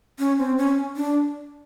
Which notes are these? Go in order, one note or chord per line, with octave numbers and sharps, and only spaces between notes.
C#4
C4
C#4
D4